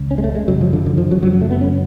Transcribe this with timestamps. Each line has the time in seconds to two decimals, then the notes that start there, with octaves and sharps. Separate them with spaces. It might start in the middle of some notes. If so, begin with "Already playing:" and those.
Already playing: C#2 C#3
0.11 C#4
0.18 G#3
0.24 A3
0.35 G#3
0.48 F#2 C#3 F#3
0.61 F3
0.73 D3
0.86 D3
0.98 F3
1.11 F#3
1.23 F#2 C#3 F#3
1.33 F#3
1.41 A3
1.51 B3
1.61 C#4